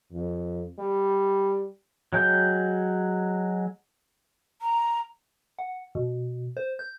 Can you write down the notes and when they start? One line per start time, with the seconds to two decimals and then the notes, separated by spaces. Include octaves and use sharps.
0.13 F2
0.79 G3
2.13 F#3 G#3 G5 G6
4.62 A#5
5.59 F#5
5.95 B2
6.57 C5
6.79 G6